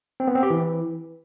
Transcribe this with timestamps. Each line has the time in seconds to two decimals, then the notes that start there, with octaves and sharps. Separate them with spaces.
0.20 C4
0.28 B3
0.35 C4
0.43 G4
0.50 E3